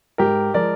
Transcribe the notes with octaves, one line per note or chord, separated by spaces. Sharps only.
G#2 G4 A#4
F3 G#3 A#4 D5